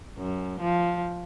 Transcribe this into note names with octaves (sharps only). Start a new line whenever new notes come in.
F#2
F3